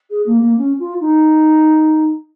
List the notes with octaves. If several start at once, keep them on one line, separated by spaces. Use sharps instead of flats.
G#4
A#3
A#3
C#4
F4
D#4